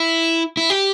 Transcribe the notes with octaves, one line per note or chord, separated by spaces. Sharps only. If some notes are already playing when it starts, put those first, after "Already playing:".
Already playing: E4
E4
G4